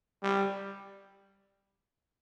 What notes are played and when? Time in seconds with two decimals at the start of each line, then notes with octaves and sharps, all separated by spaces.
0.23 G3